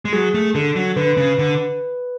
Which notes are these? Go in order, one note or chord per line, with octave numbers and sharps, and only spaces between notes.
G#3
F#3 G#4
A3
D3 A4
F#3
D3 B4
C#3
D3